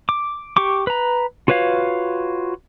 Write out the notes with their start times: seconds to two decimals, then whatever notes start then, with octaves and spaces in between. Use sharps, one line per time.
0.09 D6
0.57 G4 C#6 D6
0.87 B4 A#5
1.48 F4 F#4 B4 C#5 F5